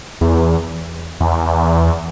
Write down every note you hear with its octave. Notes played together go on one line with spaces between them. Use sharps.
E2
E2